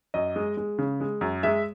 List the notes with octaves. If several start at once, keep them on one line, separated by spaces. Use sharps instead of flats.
F#2 D#5
G#3
G#3
C#3
G#3
F#2
G#3 E5